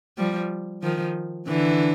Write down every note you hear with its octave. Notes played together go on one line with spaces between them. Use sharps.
F3 G3
D#3 F3
D3 E3